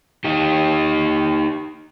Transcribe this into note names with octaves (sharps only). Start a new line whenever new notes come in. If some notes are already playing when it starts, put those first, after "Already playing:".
D#4 G4